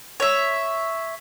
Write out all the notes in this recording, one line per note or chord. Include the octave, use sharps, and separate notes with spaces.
C#5 E5